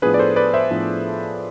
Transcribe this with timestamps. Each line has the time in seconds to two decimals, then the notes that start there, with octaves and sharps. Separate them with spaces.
0.02 A2 F3 B3 D4 G#4 B4
0.14 D5
0.19 A4 C5
0.36 B4 D5
0.54 C5 E5
0.71 A2 F3 B3 D4